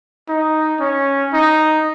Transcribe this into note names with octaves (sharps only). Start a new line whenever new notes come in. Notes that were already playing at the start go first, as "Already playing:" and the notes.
D#4
C#4
D#4